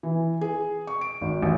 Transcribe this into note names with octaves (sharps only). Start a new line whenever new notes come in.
E3
G#4
C#6
D7
G#1
A1